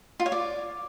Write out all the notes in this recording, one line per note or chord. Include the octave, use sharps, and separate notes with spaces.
F4
C#5
D5